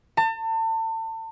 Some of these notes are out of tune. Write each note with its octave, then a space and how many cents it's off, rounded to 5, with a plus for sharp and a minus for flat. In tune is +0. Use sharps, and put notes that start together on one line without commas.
A5 +35